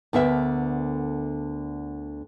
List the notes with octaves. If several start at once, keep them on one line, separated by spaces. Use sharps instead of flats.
D2 D3 B3 A#4 E5